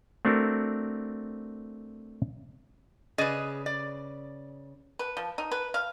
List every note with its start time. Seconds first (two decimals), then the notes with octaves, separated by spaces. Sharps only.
0.25 A3 C4 D4 F#4 A#4
3.18 C#3 G#4 B4 D5 D#5
3.66 D5
4.99 B4
5.17 F3
5.38 D#4
5.52 B4
5.74 F5